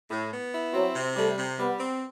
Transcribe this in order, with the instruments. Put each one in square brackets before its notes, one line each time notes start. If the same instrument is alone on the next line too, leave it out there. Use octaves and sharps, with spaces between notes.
[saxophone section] A2
B3
E4
[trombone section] F#3 [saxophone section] C4
[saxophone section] C3
[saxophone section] G3 [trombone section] A3
[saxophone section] C3
[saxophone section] G3 [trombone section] B3
[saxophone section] C4